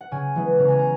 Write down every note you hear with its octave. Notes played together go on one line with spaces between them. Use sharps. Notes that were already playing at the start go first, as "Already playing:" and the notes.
F#5
C#3 G#5
E3 G#3 B3
C#3 A#5
G#5
A#5